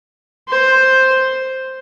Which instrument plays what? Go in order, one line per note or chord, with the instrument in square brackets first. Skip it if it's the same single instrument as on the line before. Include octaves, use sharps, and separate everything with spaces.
[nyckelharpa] C5